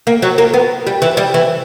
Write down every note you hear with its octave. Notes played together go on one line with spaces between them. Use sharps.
A#3
F#3
A#3
B3
G3
E3
G3
E3